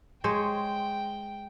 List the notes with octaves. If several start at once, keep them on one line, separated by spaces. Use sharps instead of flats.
G#3 C5 C#5 G5